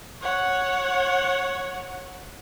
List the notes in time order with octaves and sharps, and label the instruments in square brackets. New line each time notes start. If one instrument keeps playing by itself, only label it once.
[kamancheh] C#5 F#5